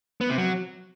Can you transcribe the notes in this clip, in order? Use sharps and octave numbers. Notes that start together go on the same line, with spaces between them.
B3
C3
F#3